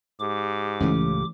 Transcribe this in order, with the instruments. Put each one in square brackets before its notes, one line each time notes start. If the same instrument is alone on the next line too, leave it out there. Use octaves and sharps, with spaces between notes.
[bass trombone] G#2 [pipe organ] G4 D6
[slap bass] C#2 A2 C#3 [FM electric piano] E3 A3 C#4